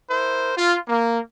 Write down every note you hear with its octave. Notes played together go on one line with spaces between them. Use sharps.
E4 A#4 C5
F4
A#3